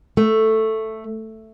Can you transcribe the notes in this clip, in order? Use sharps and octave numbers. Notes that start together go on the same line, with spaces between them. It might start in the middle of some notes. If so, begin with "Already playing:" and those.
A3